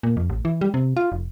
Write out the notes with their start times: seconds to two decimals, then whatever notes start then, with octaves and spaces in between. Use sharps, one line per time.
0.03 A#2
0.17 F2
0.30 A1
0.45 E3
0.61 G3
0.74 C3
0.97 F4
1.12 F1